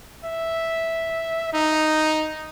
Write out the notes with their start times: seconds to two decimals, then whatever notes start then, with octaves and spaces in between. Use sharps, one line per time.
0.24 E5
1.53 D#4